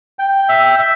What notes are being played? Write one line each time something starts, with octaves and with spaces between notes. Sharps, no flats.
G5
E5
E5